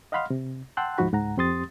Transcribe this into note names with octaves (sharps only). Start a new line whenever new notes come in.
D#5 F5 F#5 B5 C6 F6
C3
F#5 G5 A5 C6 E6 F#6
D2 G#2 F3 D#4 F#4 B5
C#2 G#2 F#5 A#5
F2 C4 G4 C6 D#6 A6